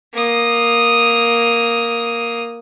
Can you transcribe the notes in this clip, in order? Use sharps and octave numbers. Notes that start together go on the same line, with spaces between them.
A#3 D#6